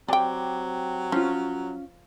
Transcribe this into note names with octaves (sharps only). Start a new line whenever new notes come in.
F#3 C4 G4 D5 G5
F3 C#4 F4